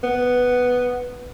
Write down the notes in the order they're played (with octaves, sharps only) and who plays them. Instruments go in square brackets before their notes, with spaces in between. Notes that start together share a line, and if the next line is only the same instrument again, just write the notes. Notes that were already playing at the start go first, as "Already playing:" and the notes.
[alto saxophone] B3